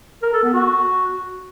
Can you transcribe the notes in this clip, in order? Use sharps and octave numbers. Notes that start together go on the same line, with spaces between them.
A#4
A4
B3
F#4